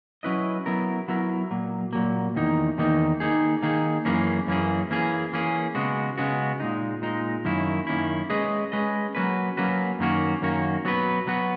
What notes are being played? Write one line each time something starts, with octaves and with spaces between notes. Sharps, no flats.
F#3 C#4 E4 B4 D#5
F#3 B3 E4 A#4
F#3 B3 E4 A#4
A#2 F#3 A#3
A#2 F#3 A#3
E2 D#3 A#3 D#4
E2 D#3 A#3 D#4
D#3 A#3 D#4 G#4
D#3 A#3 D#4 G#4
F#2 E3 A#3 C#4 G#4
F#2 E3 A#3 C#4 G#4
E3 A#3 C#4 G#4
E3 A#3 C#4 G#4
C#3 G#3 B3 F#4
C#3 G#3 B3 F#4
A#2 G#3 D#4
A#2 G#3 D#4
F#2 D#3 A#3 C#4 E4
F#2 D#3 A#3 C#4 E4
G#3 C#4 G#4 B4 D#5
G#3 C#4 G#4 B4 D#5
F#3 A#3 C#4 F#4 B4
F#3 A#3 C#4 F#4 B4
F#2 D#3 A#3 C#4 F#4
F#2 D#3 A#3 C#4 F#4
F#3 B3 F#4 B4
F#3 B3 F#4 B4